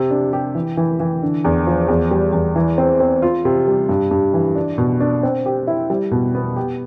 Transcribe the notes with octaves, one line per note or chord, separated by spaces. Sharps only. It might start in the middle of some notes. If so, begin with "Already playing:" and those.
Already playing: C3
D4
G4
E3
E3
E3
D3
E2
F3
E2
G3
E2
E3
C4
C4
F4
C3
G3
G2
G2
E3
D4
B2
D4
C4
G4
E4
G3
B2
B3
G4